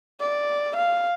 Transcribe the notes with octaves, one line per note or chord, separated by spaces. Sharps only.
D5
F5